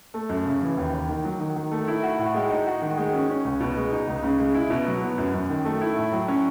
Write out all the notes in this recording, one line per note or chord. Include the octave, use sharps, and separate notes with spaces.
A3
F#2
C#3
E3
D#2
D#2
D#3
F#3
D#3
D#3
A3
E4
F#4
A2
G#3
D#4
F#4
D#3
G#3
C#4
C#4
C#2
B2
G#3
D#4
C#2
C#3
G#3
E4
B2
F#3
B3
F#2
F#2
D#3
A3
E4
A2
F#3
C#4